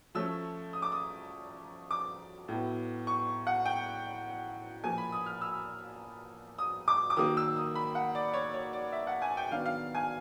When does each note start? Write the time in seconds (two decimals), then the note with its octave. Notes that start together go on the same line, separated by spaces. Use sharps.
0.15 F3 A3 C#4 E6
0.73 D#6
0.82 D6
0.92 D#6
1.91 D6
2.48 A2 F#3 B3
3.07 C#6
3.47 F#5
3.65 G5
4.84 A#2 F3 A#3 G#5
4.98 B5
5.12 D#6
5.26 F6
5.41 E6
6.59 D#6
6.88 D6
7.10 D6
7.17 D#3 F#3 A#3 D#6
7.37 E6
7.57 D#6
7.76 B5
7.95 F#5
8.15 D5
8.34 C#5
8.54 C#5
8.73 D5
8.92 E5
9.07 F#5
9.22 G#5
9.37 G5
9.51 D#3 F#3 B3 D4 F5
9.66 F5
9.95 G#5